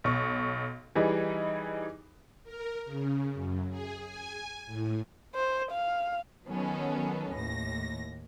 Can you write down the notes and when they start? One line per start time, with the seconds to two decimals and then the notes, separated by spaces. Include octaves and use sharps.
0.04 B1 C#6
0.95 E3 G3 D#4 G#4
2.43 A#4
2.83 C#3
3.34 F#2
3.69 G#4
4.01 G#5
4.66 A2
5.35 C5
5.72 F5
6.48 D#3 F#3 B3 C#4 A4
7.35 D#2 A2 A#6